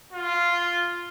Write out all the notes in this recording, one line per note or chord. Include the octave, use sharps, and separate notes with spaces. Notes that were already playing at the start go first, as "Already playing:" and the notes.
F4